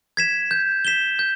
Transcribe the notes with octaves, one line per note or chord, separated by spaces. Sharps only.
G#6 B6 E7
G6
B6 E7 G7
G6